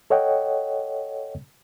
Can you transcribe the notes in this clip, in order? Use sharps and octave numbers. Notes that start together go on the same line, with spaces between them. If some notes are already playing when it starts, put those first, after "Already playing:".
A4 C#5 D#5 F#5 G5